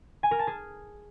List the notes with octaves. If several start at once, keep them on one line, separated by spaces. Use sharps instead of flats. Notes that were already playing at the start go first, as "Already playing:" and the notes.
G#5
A#4
A5
G#4